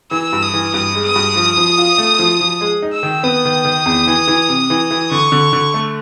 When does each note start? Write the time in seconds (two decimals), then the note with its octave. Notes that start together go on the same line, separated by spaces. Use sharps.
0.11 E3 E6
0.33 G2
0.43 D#6
0.54 E3
0.74 G2 D#6
0.95 G#3
1.05 D#6
1.16 G2
1.36 F3
1.57 F3
1.78 F4
1.98 A3
2.19 F3
2.41 F3
2.61 G#3
2.82 D#4
2.93 E6
3.03 D#3
3.24 B3 D#6
3.45 D#3
3.65 D#3
3.86 E2
4.07 E3
4.28 E3
4.48 C3
4.70 E3
4.91 E3
5.11 D3 C#6
5.32 D3
5.53 D3
5.74 A3